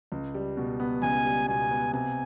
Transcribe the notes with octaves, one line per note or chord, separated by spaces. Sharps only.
C#2
G3
B2
B3
C#2 G#5
G3
B2 G#5
B3
C3 G#5